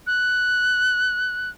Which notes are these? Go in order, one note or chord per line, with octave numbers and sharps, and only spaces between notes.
F#6